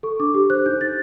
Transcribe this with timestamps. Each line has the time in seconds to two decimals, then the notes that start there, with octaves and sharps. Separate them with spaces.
0.03 A4 C#6
0.20 D4 D6
0.34 G4
0.50 C5 F#6
0.66 D#4 G6
0.80 D#4 A6